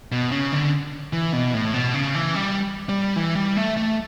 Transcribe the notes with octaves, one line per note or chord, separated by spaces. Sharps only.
B2
C#3
D3
E3
B2
A2
B2
C#3
E3
G3
G3
E3
G3
A3
A3